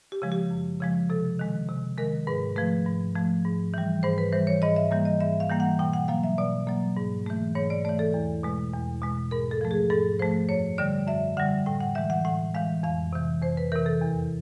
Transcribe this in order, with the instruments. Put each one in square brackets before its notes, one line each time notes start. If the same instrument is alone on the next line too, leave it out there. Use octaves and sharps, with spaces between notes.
[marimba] G4
C#3 F3 G#3
G4
F#2
C#3 F3 G#3
C3 A4
D#3 G#3
C3
D#3 G#3 A#4
G#2 B4
F3 A3 B4
G#2
F3 A3
G#2
E3 G3
G#2 C5
B4
E3 G3 C5
C#5
G#2 D#5
E5
E3 G3 A#3
D#5
G#2 E5
F5
E3 G3 A#3
F#5
B2 G5
F#5
F#3 A#3 F5
E5
B2 D5
F#3 A#3
G#2
E3 A3
G#2 C#5
D5
E3 A3 D5
A4
E2
B2 G#3
E2
B2 G#3
G#2 A#4
A4
F3 A3
G#4
G#2 A4
F3 A3 C5
F#2 C#5
D3 G3 D5
F#2 E5
D3 G3 F#5
A2 G5
F#5
E3 G#3 E5
F#5
A2 F#5
E3 G#3 F5
F2 F5
C3 E3
F2 C5
B4
C3 E3 A#4
A4
E2